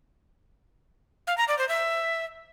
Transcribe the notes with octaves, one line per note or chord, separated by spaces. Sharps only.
F5
A#5
D5
C5
E5